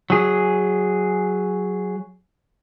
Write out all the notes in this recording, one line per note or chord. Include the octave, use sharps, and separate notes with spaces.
F#3 G#4